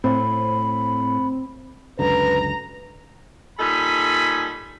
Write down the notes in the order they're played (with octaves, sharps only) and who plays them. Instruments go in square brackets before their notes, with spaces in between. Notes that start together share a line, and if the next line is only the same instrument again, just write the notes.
[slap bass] A2 [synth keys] C4 [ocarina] B5
[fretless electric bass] C#2 F#2 D3 [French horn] B4 [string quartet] A#5
[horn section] A#2 G3 D#4 A4 G#5 B5